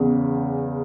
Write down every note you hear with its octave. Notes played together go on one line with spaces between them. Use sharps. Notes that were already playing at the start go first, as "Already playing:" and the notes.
Already playing: E2 C#3